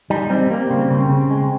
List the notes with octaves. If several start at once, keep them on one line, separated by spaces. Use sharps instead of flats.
G3 D#4
G3 C4
G3 A#3
C#3 C4
C#3
C#3
G#3